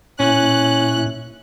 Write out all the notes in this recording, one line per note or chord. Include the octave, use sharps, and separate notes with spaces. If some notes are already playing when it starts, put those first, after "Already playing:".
A#2 C#4 E4 F#6